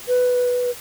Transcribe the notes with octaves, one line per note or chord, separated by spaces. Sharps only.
B4